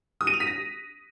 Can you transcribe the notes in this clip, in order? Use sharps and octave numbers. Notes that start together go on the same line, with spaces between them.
D#6
D#7
F7
B6
A#6